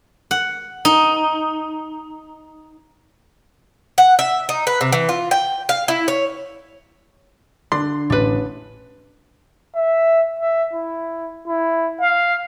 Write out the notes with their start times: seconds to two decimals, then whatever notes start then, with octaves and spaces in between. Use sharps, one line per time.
0.31 F#5
0.85 D#4
3.98 F#5
4.19 E5
4.49 D#4
4.67 B4
4.81 C3
4.93 E3
5.09 F4
5.31 G5
5.69 F5
5.88 E4
6.08 C#5
7.72 D3 D4 C6
8.10 A1 D4 B4
9.75 E5
10.39 E5
10.73 E4
11.47 E4
12.01 F5